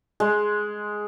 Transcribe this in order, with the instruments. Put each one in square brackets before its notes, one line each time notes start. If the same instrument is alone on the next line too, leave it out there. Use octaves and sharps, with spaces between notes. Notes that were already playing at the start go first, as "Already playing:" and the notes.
[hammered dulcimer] G#3